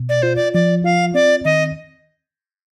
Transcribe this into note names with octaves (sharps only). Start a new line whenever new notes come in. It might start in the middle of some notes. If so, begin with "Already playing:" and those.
Already playing: B2
D5
F4 C5
D5
F3 D5
F4 F5
C4 D5
D#3 D#5